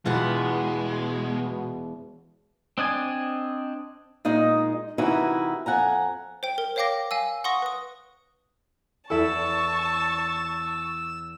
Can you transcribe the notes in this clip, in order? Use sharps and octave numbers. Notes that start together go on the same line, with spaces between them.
E1 B2 G#3 F4 F#4 F#5 B5
C4 D4 D#5 G#5
A#2 G#3 D#4 D#5
C3 E3 D#4 E4 F#4 A#4
F2 F#5 G#5 A#5
C5 G5
A#4
C5 C#5 F5 G5 D6 A#6
F5 G#5 E6
F#5 C6 C#6 D#6 A#6
B4 D#6
E2 E4 A4 A5 C#6 E6